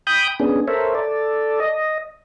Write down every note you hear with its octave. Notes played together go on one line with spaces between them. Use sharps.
G5 B5 D#6 G6
B3 C#4 D4 G#4
A4 A#4 C5 C#5 E5
A4 D5
D#5